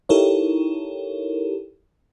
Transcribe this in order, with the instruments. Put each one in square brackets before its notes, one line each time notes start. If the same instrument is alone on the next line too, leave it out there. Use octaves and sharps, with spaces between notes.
[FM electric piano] D#4 E4 G4 A4 A#4 C#5